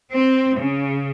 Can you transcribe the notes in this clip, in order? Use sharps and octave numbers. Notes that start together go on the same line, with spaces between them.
C4
C#3